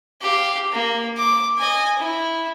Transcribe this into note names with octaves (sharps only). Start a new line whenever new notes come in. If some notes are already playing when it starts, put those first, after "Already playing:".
G4 F5
A#3
D6
D#5 G#5
E4